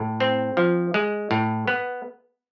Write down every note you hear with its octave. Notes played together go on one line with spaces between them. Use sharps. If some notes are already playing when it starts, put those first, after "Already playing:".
Already playing: A2
C4
F3
G#3
A2
B3